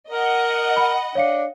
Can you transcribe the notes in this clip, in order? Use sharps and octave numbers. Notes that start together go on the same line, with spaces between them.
A#4 D#5 F#5
B5
D4 C#5 F5 C#7